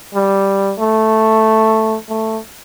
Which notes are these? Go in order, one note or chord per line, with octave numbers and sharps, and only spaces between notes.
G3
A3
A3